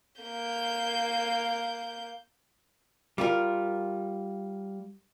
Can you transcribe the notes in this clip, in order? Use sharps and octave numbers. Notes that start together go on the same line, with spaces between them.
A#3 G6
G3 F4 A#4